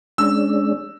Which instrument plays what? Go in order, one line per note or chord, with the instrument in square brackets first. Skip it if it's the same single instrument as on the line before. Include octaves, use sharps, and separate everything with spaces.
[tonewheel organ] G#3 C#4 D4 [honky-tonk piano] E6